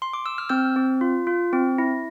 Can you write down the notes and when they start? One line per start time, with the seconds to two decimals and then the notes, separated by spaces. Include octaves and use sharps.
0.02 C6
0.13 D6
0.26 E6
0.38 F6
0.49 C4 E6 G6
0.76 C4
1.01 F4
1.27 F4
1.53 C4
1.78 E4